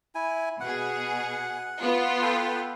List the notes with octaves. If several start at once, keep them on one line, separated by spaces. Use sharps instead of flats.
E4 G#5
B2 G#4 F#5
B3 F4
A4 B4 G5